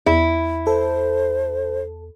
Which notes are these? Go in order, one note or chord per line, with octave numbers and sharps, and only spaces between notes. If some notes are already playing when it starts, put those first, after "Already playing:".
E2 E4
A4 C5